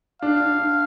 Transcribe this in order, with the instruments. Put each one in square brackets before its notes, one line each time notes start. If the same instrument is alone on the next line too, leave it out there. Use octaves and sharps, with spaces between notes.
[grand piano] D4 [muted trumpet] F5
[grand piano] D4
D4